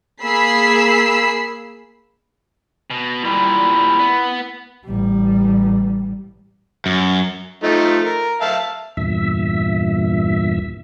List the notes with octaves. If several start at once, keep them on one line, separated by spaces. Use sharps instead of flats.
A#3 G#4 B5 E6 B6 C7
B2
A#2 G3 E4
B3
A1 G3
F#2
F3 A3 D#4
A#4
E5 F5 A5
E2 G2 A#2 E5